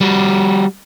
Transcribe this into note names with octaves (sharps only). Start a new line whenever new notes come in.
G3 F#4